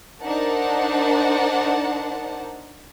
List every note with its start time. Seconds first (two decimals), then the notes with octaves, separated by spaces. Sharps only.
0.23 D4 D#4 A#4 C5 F#5 A5